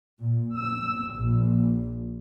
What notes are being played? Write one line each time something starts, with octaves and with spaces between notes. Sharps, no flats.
A#2
E6
A#1